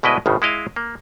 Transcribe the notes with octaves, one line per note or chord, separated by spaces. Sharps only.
D2 B2 G#3 E4 B4 D#5
G#1 A2 C#3
G#3 E4 D#5 F5
A#3